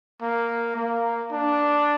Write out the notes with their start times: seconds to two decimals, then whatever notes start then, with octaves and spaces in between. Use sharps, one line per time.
0.22 A#3
0.76 A#3
1.32 D4